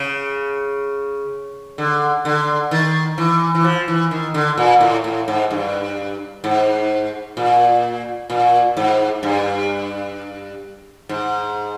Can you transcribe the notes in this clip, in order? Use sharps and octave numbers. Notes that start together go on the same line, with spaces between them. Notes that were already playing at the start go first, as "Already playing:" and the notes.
Already playing: C#3
D3
D3
D#3
E3
E3
F3
E3
D#3
D3
A#2
A2
A2
G#2
G2
G#2
A#2
A#2
G#2
G2
G#2